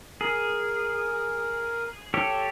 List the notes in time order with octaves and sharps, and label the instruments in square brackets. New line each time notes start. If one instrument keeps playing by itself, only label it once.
[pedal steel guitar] G#4 [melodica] A#4
[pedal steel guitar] G4 A4 C#5